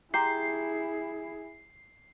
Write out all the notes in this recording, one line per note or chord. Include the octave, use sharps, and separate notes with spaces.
E4 G4 G#4 F#5 A#5 C6 C7